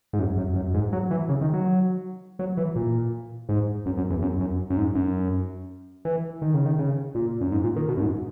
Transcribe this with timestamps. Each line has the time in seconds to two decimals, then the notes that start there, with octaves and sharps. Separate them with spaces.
0.13 G#2
0.19 F#2
0.37 F#2
0.56 F#2
0.74 G#2
0.93 F#3
1.11 E3
1.29 C#3
1.41 D#3
1.53 F#3
2.39 F#3
2.57 E3
2.76 A#2
3.49 G#2
3.86 F#2
3.98 F#2
4.10 E2
4.22 F#2
4.40 F#2
4.70 F#2
4.77 G#2
4.95 F#2
6.05 E3
6.42 D#3
6.54 C#3
6.66 D#3
6.79 C#3
7.15 A#2
7.41 F#2
7.52 G#2
7.64 A#2
7.76 D#3
7.88 B2
7.97 F#2
8.00 G#2